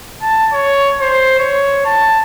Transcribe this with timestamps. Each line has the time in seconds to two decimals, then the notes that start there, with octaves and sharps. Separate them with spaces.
0.22 A5
0.52 C#5
1.01 C5
1.39 C#5
1.85 A5